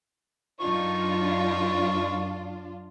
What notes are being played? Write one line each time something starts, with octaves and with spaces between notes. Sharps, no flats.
F#2 D4 D#4 F4 C#6